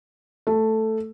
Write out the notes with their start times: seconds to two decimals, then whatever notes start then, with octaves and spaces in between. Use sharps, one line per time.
0.47 A3